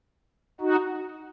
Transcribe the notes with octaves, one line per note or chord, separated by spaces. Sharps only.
D#4 F#4